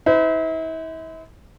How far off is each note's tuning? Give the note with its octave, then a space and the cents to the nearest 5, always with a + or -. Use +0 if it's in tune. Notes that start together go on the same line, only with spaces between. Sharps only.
E4 -40 C5 -45